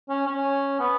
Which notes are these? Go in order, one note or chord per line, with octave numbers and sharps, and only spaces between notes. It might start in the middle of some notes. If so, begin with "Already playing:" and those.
C#4
C#4
B3